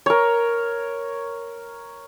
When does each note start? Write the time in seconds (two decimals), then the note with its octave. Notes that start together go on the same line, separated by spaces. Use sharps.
0.06 A#4 C#5